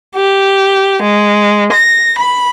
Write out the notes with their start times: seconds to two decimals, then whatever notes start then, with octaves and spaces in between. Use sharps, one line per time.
0.16 G4
1.02 G#3
1.72 A#6
2.17 B5